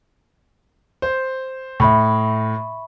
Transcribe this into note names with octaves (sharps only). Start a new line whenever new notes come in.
C5
A2 E5 B5 C#6